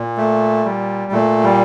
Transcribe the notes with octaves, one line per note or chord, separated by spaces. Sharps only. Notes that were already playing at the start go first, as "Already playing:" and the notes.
Already playing: A#2
A3
G3
A#2 A3
G3